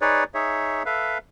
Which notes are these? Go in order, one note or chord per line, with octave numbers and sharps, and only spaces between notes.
D#4 G#4 B4 C#5 D5
D#4 G#4 C#5 E5
A4 B4 E5 F5